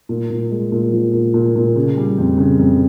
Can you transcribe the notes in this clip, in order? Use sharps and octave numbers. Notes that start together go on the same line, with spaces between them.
A#2
A#2
G#3
A#2
F3
A#2
A#2
A#2
C#3
G3
F2
C#3
F2